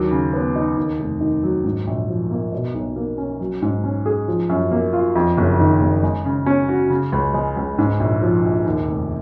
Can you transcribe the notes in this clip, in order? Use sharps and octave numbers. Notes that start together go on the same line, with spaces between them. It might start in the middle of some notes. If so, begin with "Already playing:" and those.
Already playing: D#2 F#3
C#3
B3
D#4
D#2
F1
D#3
F#3
G#2
A#1
F3
A#3
B2
B1
A#3
C#4
F#3
G#2
C#4
G#4
F3
F#2
A#3
F4
F2
F#1
D#3
F#1
G#3
C#3
C#4
F#4
C#3
C#2
G#3
C#2
G#2
A#1
F3
A#1
D#2
F1